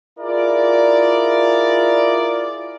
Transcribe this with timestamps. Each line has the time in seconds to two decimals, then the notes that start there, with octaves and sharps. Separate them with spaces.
0.19 E4 F4 G#4 A#4 D5